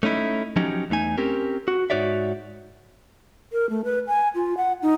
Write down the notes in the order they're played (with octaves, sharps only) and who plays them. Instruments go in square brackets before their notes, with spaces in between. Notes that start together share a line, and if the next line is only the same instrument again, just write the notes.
[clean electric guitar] A3 C#4 D#4 E4
F3 F#3 C#4 D#4 G4
E2 A3 D#4 G#5
C4 C#4 G4 A#4
F#4
G#2 D#4 F#4 C#5 D5 E5
[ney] A#4
A3
B4
G#5
F4
F#5
D#4